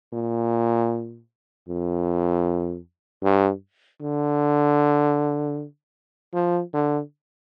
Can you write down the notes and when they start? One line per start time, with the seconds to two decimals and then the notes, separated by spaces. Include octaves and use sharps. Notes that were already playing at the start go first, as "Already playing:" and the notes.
0.13 A#2
1.69 F2
3.24 G2
4.02 D3
6.34 F3
6.74 D3